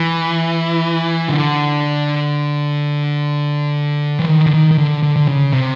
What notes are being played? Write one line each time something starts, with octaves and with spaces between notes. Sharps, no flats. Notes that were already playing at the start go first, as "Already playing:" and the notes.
Already playing: E3
D3
E3
D#3
D3
D#3
D#3
D3
D3
D3
C#3
C3